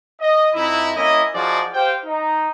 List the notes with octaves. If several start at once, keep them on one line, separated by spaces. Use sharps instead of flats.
D#5
F2 D#4 E4
A#3 C#4 E4 D#5
F3 D#4 F#4 G#4 D5
G4 C5 F5 G5
D#4